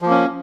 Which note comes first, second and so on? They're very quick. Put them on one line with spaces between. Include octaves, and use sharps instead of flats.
F3 A#3 C#4